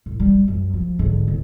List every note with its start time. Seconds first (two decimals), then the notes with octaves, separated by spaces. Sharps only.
0.06 A2
0.20 G3
0.48 F#2
0.74 F3
0.99 G#2 D3
1.28 D1